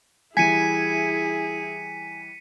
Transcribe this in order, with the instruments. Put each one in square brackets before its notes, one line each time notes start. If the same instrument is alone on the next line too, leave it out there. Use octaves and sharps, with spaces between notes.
[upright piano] E3 G3 [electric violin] E4 G#4 [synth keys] G#5 [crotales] B6 C#7 D#7